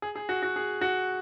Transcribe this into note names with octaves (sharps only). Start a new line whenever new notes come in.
G#4
G#4
F#4
F#4
G#4
F#4